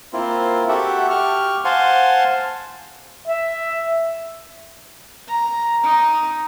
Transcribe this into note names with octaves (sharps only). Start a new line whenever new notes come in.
A#3 C4 E4 F4
F#4 G4 A4 E5 F#5
G4 C#6 F6
C5 F5 F#5 G#5 A5 C6
E5
A#5
D#4